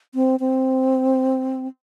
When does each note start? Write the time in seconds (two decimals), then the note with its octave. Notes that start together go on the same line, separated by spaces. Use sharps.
0.15 C4
0.40 C4